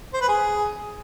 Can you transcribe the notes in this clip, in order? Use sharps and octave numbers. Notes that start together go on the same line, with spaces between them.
C5
B4
G#4